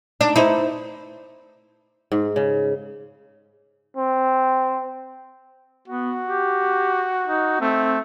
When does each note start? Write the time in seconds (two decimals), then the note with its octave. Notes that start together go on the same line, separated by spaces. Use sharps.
0.21 D4 D#4 D5
0.36 B3 D#4 E4 C5
2.12 G#2
2.36 C#3
3.97 C4
5.88 B3 F#4
6.27 G4
7.27 D#4
7.61 A3 C4